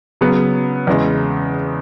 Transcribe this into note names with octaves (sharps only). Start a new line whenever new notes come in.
C#3 F#3 B3
E2 C#3 G#3